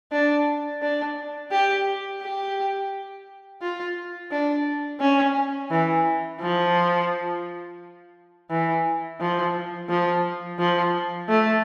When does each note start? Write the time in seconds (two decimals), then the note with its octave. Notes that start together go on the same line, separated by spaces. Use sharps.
0.12 D4
0.82 D4
1.51 G4
2.21 G4
3.62 F4
4.31 D4
5.00 C#4
5.71 E3
6.40 F3
8.50 E3
9.20 F3
9.89 F3
10.59 F3
11.29 A3